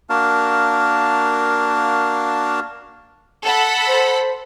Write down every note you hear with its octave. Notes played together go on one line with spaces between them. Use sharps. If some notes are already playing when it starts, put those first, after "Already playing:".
A#3 D4 F#4 A#4 F5 A5
A4 F#5 B5
C5